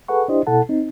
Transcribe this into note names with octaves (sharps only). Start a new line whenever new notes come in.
G#4 A4 B4 F#5 C#6
D4 E4 G4 C5 D#5
B2 E4 A4 F#5 A5
C4 D#4